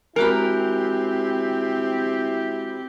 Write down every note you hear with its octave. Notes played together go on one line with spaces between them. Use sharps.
G#3 C4 E4 F#4 G4 A#4 B5